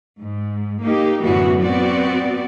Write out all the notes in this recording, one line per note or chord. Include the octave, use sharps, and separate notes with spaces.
G#2
A#3 D#4 G4
F#2 A2 D3 E3 B3 F#4
B3 C4 F#4 D5